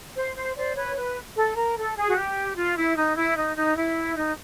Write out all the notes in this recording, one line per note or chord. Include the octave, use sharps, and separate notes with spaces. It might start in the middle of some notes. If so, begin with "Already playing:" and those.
C5
C5
C5 D5
B4 C#5
B4
A4
A#4
A4
G#4
F#4
G4
F4
E4
D#4
E4
D#4
D#4
E4
D#4